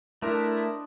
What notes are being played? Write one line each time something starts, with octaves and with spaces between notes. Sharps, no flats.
A3 D4 E4 A#4 C5 D#5